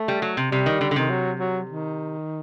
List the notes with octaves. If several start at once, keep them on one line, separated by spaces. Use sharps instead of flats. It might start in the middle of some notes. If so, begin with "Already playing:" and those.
Already playing: A3
G3
F#3
C3
C3 G3
D#3
D3
D3
C3 D#3
F#3
F#3
D#3